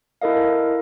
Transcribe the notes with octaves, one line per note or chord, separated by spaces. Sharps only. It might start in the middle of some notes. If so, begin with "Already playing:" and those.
E4 A4 A#4 D#5 F5